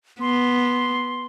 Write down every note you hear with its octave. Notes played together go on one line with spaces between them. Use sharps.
B3 C6